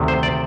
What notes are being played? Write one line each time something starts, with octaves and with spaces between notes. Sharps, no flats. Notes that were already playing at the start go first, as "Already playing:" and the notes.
Already playing: D2 C3 D#3
C5
D5